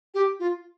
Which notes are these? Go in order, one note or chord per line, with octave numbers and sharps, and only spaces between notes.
G4
F4